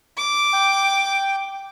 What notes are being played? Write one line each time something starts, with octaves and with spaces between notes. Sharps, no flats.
D6
G5